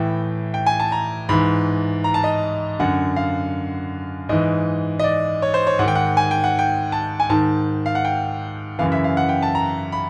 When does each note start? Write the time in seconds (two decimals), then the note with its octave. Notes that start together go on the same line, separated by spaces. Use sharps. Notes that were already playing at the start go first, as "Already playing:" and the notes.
Already playing: A2 E3 G5
0.54 G5
0.66 G#5
0.80 A5
0.92 A#5
1.29 G#2 E3 B5
2.04 A#5
2.14 A5
2.24 D#5
2.79 F#2 D3 F#5
3.16 F5
4.29 G#2 E3 D#5
4.99 D#5
5.04 D5
5.42 C#5
5.54 C5
5.67 C#5
5.79 G#2 F#5
5.84 D#3 G5
5.95 F#5
6.17 G#5
6.31 G5
6.44 F#5
6.59 G5
6.92 A5
7.20 G#5
7.30 G#2 D#3 A5
7.86 F5
7.95 F#5
8.05 G5
8.79 F#2 C#3 E3 F5
8.92 E5
9.04 F5
9.17 F#5
9.29 G5
9.42 A5
9.55 A#5
9.92 B5